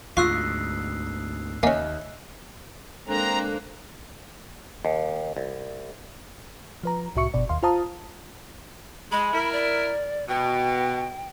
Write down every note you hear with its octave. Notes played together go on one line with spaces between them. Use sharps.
D2 G#2 F4 C#6 E6 F#6 C7
D#2 A#3 C#4 D#5 E5 G#5
G#3 A#3 C4 D4 A4 C5 A#5 F#6
D#2
C2
F3 B4 A#5
C2 A2 F#4 E5 C#6 C#7
G1 B2 D5
D#2 F5 C6
F4 C5 F5 A5 A#5 D#6
G#3 B5
E4 A#4
D5
B2 G5